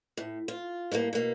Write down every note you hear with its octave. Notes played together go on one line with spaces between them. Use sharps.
A2
F4
A2 G3 A3 A#3
B2 A#3